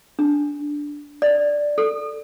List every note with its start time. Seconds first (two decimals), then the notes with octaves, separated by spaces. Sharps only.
0.19 D4
1.22 D5
1.78 A4